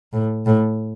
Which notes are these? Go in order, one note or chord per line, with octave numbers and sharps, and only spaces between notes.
A2
A2